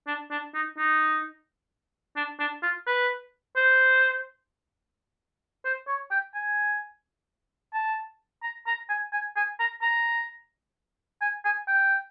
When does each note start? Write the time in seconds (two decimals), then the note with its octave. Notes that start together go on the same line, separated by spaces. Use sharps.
0.07 D4
0.30 D4
0.54 D#4
0.77 D#4
2.16 D4
2.39 D4
2.62 F4
2.87 B4
3.56 C5
5.65 C5
5.87 C#5
6.11 G5
6.34 G#5
7.74 A5
8.43 A#5
8.67 A#5
8.89 G#5
9.13 G#5
9.36 G#5
9.59 A#5
9.82 A#5
11.21 G#5
11.45 G#5
11.68 G5